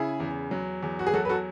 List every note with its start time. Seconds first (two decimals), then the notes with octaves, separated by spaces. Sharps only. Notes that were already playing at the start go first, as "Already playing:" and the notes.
Already playing: C#3 E4 G#4
0.20 E2
0.51 F#3
0.83 E2
0.99 F#4
1.07 G#4
1.14 F#3 F#4 A4
1.25 B4
1.29 F#4 A4